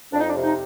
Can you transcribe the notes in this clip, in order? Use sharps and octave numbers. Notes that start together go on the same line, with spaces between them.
F2 D4
D#4
D4
C3
D#4